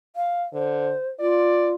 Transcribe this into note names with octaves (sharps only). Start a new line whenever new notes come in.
F5
D3 C5
F4 D5